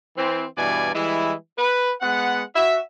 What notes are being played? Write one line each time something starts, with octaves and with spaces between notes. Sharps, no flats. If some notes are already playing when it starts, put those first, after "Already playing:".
E3 C4
G2 B2 E3 D5 G#5
E3 G3 G#3 E4
B4
G#3 B3 F#5
F#4 E5